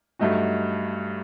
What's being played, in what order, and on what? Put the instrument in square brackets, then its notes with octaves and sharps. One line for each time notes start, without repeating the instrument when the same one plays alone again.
[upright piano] G2 F#3 A3 D#4 F#4